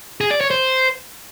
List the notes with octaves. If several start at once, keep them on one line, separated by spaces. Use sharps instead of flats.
G#4
D5
C#5
C5